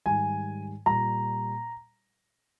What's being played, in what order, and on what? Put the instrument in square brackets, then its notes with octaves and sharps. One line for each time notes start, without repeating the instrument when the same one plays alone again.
[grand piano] G#2 D#3 G3 G#5
A#2 G3 A#5